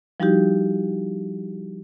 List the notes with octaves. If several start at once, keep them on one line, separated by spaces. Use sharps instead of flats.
F3 G3 D#4 E4 F#4 G4